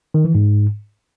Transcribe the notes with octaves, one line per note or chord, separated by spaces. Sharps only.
D#3
E3
G#2